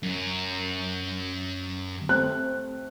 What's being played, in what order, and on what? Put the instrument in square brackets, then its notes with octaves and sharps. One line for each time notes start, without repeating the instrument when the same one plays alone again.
[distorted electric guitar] F#2
[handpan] A3 C4 [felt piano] F#6